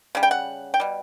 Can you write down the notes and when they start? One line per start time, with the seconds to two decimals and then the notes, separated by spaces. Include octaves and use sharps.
0.15 C#3 G3
0.23 G5
0.31 F#5
0.74 G5
0.80 B2 G3